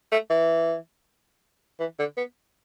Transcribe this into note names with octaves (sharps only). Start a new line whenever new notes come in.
A3
E3
E3
D3
B3